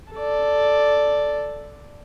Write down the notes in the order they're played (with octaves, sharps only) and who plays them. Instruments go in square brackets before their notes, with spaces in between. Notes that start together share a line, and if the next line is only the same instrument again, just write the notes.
[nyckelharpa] A4 D5